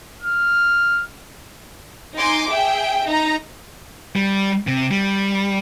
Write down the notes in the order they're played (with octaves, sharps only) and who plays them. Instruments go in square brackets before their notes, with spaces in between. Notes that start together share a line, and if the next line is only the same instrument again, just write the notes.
[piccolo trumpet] F6
[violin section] D#4 G#5 C6 D6
G#4 E5 G5
D#4 A#5
[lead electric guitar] G3
C3
G3